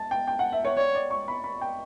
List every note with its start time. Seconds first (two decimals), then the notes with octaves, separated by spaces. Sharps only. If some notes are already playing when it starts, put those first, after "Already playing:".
Already playing: A5
0.11 G5
0.27 G5
0.39 F#5
0.52 E5
0.65 C#5
0.77 C#5 D5
0.95 D5
1.10 C#6
1.28 B5
1.44 B5
1.61 G5